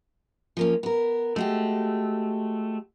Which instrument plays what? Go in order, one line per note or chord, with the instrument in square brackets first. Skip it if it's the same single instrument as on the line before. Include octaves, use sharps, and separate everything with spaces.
[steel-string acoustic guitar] F3 A#3 C#4
B3 A#4
[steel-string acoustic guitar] G#3 F#4 G4 [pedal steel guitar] A3